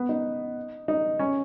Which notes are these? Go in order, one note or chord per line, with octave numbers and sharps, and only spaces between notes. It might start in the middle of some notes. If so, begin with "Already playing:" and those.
Already playing: B3
D#4
D#4
C#4